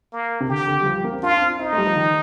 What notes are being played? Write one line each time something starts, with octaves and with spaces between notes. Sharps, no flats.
A#3
C3
D3 G4
D3
G3
F3
G3
A#3
C4
D4 F4
D4
C4
C4 D#4
A3
G3
F3
D#3